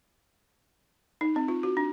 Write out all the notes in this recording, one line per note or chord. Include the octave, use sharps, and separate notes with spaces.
D#4
C4
F4
F#4
D4